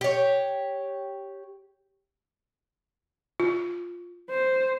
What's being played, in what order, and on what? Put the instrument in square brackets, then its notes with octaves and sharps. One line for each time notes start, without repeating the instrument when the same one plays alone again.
[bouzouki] G4 C#5
[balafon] F4
[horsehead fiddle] C5